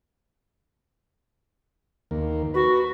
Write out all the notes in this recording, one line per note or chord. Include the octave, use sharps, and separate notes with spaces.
D#2 A#3
F#4 B4